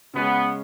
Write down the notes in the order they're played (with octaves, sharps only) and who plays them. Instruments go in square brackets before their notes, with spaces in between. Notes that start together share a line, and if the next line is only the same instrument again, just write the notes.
[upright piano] C#3 G#3 C#4 [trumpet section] B3